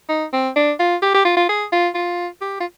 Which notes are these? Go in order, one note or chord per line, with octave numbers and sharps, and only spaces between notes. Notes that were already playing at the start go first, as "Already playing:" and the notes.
D#4
C4
D4
F4
G4
G4
F4
F4
G#4
F4
F4
G4
F4